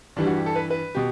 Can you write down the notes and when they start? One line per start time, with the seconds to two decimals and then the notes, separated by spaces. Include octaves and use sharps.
0.16 G2 E3 G3 D4
0.27 F#4
0.36 G4
0.46 A4
0.55 B4
0.70 B4
0.95 B2 G4